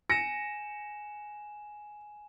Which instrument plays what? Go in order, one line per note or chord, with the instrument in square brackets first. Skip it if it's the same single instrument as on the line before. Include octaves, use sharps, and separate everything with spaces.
[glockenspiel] G#5 E7 [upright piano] A#6 C#7